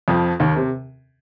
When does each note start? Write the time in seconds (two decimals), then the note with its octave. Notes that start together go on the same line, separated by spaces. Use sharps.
0.08 F2 F3
0.40 D#2 D#3
0.56 C3